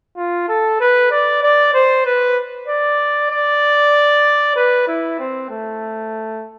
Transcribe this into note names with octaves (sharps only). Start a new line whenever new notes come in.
F4
A4
B4
D5
D5
C5
B4
D5
D5
B4
E4
C4
A3